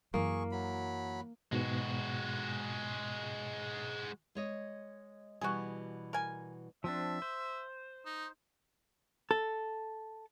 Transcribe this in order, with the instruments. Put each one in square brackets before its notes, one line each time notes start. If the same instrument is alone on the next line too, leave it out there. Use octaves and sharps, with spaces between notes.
[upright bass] F#2 E3 [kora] A#3 [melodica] G#4 C#6
[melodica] F#3 B5
[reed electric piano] G#2 B2 [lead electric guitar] G#3 F#4
[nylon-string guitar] G#3 C#5 D#5
[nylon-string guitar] B2 E3 G3 [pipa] F#4 G#4
[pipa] A#4 G#5
[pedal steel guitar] F3 C4 D4 [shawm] E5
[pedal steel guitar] C5
[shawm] D#4
[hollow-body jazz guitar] A4